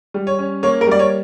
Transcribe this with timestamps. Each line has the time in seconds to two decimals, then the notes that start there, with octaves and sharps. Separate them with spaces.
0.14 G3
0.27 C#5
0.39 C#4
0.63 A#3 C#5
0.81 A#4
0.87 G3 D5
0.99 C#5